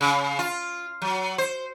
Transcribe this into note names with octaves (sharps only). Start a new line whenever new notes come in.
C#3
F4
F#3
C5